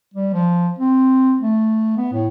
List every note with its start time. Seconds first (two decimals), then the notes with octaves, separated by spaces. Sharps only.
0.14 G3
0.33 F3
0.79 C4
1.41 A3
1.97 B3
2.13 A2